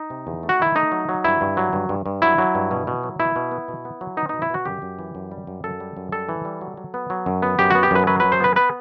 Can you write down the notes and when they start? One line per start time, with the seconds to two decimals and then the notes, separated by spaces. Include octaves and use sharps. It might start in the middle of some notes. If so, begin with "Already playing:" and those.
Already playing: D#4
0.10 C3
0.27 E2
0.43 A3
0.49 F#4
0.60 D#3 E4
0.76 A3 D#4
0.92 F#3
1.09 F#3
1.24 G2 E4
1.41 G2
1.57 F#3
1.73 G2
1.89 G2
2.06 G2
2.22 F#3 E4
2.38 F#3
2.55 G2
2.71 B2
2.87 B2
3.03 F#3
3.19 B2 E4
3.36 B2
3.52 B3
3.68 B2
3.85 B3
4.01 F#3
4.17 B3 D#4
4.29 B2 D#4
4.42 E4
4.50 B2 F#4
4.65 F#2 G4
4.82 F#2
4.99 E3
5.15 F#2
5.32 G3
5.47 F#2
5.64 F#2 A4
5.80 G3
5.97 F#2
6.12 G3 A4
6.29 E3
6.45 G3
6.61 F#3
6.77 F#3
6.94 B3
7.10 F#3
7.26 F#2
7.42 B3
7.59 F#2 G4
7.70 B3 F#4
7.83 G4
7.91 F#2 B4
8.07 F#3 B4
8.20 F#2 B4
8.32 C5
8.40 B3 B4
8.56 B3 B4